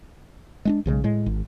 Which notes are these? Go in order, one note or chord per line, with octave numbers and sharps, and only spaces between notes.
G#3 C#4 D4
B1 C#3 F3 G#3
A2 G#3
G#1